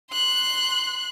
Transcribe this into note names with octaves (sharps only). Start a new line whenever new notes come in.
C6 F#6